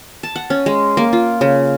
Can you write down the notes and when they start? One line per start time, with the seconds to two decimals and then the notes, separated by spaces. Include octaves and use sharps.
0.23 A5
0.36 F#5
0.50 C#4
0.66 G#3
0.97 A#3
1.13 F4
1.41 C#3